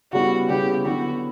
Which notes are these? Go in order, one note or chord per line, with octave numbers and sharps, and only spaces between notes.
C#3 G3 B3 E4 F#4
C#3 G3 B3 E4 G4
D3 F#3 B3 E4 F#4